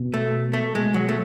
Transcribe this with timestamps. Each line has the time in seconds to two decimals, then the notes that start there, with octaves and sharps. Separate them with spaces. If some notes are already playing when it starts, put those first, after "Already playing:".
Already playing: B2
0.14 A3
0.53 A3
0.75 B2 G#3
0.94 F#3
1.09 A3